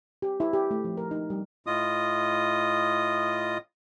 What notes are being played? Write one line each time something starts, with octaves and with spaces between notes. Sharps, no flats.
G4
E4
G4
A3
F3
A#4
D#4
G3
A2 F4 D#5 D#6